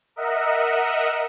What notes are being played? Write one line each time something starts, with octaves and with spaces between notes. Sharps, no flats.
A#4 D#5 E5 F#5